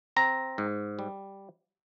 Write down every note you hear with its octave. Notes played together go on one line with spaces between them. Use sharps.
C4 A#5
G#2
G3